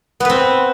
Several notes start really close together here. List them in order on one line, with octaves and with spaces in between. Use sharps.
B3 B4 C4